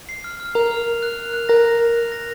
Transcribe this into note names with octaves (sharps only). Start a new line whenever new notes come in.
C7
F6
F6
A#4 F7
F6
F7
F#6
F7
F#6
A#4 A#6
F#6
F7
F#6
A#6